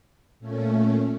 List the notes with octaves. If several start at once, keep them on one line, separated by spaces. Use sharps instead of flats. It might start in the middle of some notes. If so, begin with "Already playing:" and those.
A#2 A3 C#4